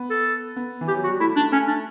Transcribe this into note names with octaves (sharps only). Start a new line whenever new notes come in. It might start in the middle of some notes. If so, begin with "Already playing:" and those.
Already playing: B3
A4
B3
E3
G4
F#3
F#4
G3
A3 E4
D4
A3 C#4
D4